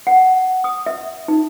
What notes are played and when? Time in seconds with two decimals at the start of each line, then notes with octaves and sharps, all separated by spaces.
0.07 F#5
0.64 D#6
0.86 E5
1.28 D#4